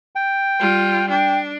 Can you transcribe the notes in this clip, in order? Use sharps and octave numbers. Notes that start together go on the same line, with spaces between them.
G5
G3 F4
D4 G5